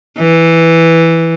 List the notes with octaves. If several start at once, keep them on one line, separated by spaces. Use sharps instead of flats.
E3